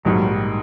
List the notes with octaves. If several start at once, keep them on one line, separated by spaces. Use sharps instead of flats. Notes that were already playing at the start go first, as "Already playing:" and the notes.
A#1 G#2 D#3 F#3 G3